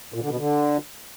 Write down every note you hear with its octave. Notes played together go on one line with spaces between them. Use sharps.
A#2
D3
B2
D3